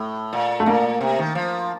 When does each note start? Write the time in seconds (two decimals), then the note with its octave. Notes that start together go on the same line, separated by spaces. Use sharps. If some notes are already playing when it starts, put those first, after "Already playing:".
Already playing: A2 A3
0.33 A#2
0.60 A3
0.66 A#2 A#3
1.01 C3
1.19 D#3
1.35 F3